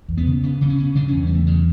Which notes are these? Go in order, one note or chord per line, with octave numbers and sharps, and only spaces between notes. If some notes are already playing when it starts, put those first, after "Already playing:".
E2
B3
C#3
C#3 B3
C#3
C#4
C#3
C#3 D4
E2 C#4
G3
E2 A3
C#3 F#3